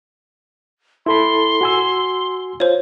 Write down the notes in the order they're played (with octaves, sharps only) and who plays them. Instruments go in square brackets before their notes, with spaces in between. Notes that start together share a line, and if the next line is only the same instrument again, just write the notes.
[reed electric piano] E4 A4 B5 [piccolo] C6
[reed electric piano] F#4 G#5 E6
[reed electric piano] F4 [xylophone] C5 C#5